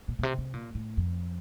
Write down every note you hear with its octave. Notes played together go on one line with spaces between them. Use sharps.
A#2
A#2
C3
C3
A#2
A2
F2